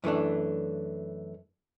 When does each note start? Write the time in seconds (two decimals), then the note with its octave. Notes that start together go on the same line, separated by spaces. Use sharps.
0.04 F#2 E3 A3 D4